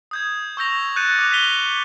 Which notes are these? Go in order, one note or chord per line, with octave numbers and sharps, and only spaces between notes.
D#6 G6 G#6
C#6 E6 G6 A#6 F7
F#6 G6 A6 C#7 D#7
D6 D#7 F7
B6 D#7 F7 G7